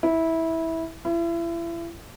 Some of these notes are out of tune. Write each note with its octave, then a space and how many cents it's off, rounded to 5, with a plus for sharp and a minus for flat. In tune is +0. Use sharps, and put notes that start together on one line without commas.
E4 -15
E4 +35